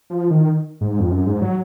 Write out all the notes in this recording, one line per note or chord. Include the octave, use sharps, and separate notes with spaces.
F3
D#3
G#2
F2
F#2
G#2
F#3